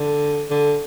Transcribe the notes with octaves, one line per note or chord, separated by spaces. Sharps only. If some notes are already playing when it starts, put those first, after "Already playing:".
Already playing: D3
D3